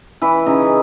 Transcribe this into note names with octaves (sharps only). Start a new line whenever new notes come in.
E3 E4
C#3 D#4